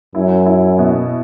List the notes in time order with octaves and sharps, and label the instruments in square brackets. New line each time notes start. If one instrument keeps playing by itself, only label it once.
[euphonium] F#2 [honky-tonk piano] E4
[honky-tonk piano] E4
B2